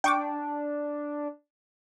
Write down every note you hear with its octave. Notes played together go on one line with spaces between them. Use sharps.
D4 G5 C#6 D6